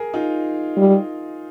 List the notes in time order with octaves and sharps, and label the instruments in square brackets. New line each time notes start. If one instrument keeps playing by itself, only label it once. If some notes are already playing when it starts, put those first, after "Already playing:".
Already playing: [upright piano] G#4 A#4
D#4 F4
[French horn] G3